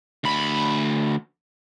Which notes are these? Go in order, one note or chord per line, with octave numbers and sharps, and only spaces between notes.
D2 B5